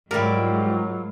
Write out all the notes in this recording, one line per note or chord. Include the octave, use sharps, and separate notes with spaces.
G#2 F#3 G3 E4 F4 G4 A#4